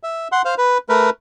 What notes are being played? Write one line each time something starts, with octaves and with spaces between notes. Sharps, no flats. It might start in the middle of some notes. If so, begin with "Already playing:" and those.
E5
F#5 C6
C5 F5
B4
A3 A#4 B4